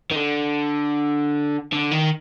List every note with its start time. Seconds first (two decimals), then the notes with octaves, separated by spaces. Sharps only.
0.11 D#3
0.16 D3
1.72 D3
1.91 D#3